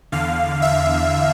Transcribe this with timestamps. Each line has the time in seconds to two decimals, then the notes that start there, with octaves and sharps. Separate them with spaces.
0.12 E2 D3 F5
0.62 E5